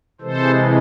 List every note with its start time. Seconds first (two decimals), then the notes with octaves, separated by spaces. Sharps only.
0.21 C3 E3 G#3 A4 C5